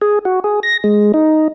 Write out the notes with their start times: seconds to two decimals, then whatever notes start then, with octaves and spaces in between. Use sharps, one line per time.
0.02 G#4
0.25 F#4
0.44 G#4
0.63 A#6
0.84 G#3
1.14 D#4